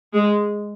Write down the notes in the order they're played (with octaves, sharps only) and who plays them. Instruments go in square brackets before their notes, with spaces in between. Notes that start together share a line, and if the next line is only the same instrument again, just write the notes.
[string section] G#3